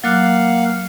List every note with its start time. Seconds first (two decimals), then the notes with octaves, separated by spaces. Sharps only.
0.04 F#3 A#3 F5 F#5 D6 F#6